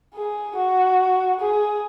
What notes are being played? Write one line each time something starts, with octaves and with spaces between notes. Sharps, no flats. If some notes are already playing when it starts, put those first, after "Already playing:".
G#4
F#4
G#4